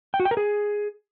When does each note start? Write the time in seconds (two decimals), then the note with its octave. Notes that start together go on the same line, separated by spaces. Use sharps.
0.14 G5
0.20 F#4
0.25 G5
0.31 A#4
0.37 G#4